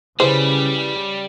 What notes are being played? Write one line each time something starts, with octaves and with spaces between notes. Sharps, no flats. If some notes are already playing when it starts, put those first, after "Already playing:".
C#3 G3 E4 G#4 B4 C5